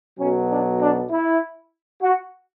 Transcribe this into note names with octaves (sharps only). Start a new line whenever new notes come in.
B1 B2 F#3 C#4
D4
D4
E4
F#4